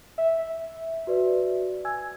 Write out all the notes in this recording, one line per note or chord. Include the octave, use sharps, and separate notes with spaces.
E5
F#4 B4 D5
G#5 E6 G#6